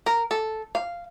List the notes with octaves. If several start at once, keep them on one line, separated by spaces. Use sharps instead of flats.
A#4
A4
F5